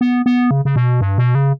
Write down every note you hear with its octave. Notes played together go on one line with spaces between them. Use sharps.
B3
B3
C#3
C#3
B2
G2
B2
C#3